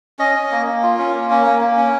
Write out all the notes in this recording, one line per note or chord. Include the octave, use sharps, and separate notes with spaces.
C#4 D#5
C#4
A#3
A#3
F4
C#4
A#3
C#4
A#3
A#3
C#4